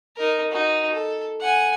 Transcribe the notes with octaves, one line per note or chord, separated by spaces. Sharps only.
D#4 A#4
D#4 F#4
A4
F#5 G#5